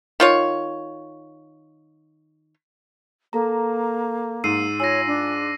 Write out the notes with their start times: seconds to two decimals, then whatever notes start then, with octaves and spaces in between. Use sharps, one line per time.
0.20 D#3 F4 C#5
3.33 A#3 A4 A#5
4.44 G#2 E6 C7 D#7
4.80 F4 C#5 G#5 E6 A#6
5.07 D4